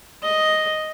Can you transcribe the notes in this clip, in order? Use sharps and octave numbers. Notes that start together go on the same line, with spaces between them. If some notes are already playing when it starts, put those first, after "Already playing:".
D#5